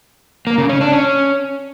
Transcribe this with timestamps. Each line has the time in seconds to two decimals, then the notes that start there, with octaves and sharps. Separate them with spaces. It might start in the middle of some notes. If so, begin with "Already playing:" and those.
0.47 A#3
0.58 C#3
0.69 C#4
0.81 D4
0.92 C#4